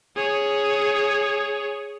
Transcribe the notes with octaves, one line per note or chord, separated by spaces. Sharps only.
G#4 C#5